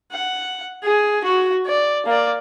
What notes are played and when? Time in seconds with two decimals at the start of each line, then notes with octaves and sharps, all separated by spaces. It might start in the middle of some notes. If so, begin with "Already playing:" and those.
0.12 F#5
0.83 G#4
1.24 F#4
1.66 D5
2.06 A#3 D5